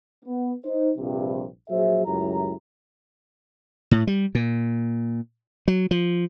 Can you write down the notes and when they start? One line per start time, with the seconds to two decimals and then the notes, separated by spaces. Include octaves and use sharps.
0.25 B3
0.64 D#4 C5
0.98 A#1 G2 C3
1.70 A#1 F#3 G#4 C5 E5
2.06 C#2 F#2 A2 E4 G4 A#5
3.91 A2
4.07 G3
4.35 A#2
5.68 F#3
5.91 F3